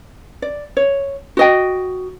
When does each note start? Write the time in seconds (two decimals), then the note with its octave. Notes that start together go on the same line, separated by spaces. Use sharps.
0.42 D5
0.77 C#5
1.37 F#4 D#5 G5